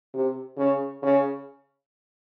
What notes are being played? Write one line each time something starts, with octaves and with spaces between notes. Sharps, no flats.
C3
C#3
C#3